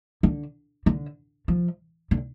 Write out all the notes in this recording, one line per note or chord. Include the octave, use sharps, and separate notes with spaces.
D3
D3
F3
D3